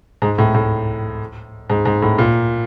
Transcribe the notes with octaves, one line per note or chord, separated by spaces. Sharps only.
G#2
A2
A2
G#2
G#2
A2
A#2